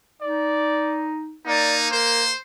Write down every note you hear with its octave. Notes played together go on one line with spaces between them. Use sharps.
D#4 D5
A#3 D#4 D5
A#4 C5